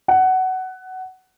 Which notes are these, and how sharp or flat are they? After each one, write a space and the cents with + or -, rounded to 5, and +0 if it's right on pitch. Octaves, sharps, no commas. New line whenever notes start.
F#5 +15